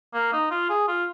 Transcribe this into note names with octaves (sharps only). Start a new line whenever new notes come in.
A#3
D#4
F4
G#4
F4